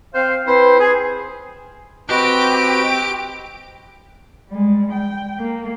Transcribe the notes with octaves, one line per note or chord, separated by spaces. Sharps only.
C4 C5 F5
C4 E4 B4 C5
G#4
C4 F#4 G4 B4 D#5 D7
G3 G#3
G5
A#3